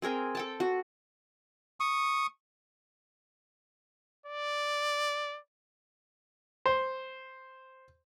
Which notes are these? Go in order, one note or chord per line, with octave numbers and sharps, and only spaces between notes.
C4 G#4 A#4 G5
A4 G5 A5
F#4
C#6 D#6
D5
C5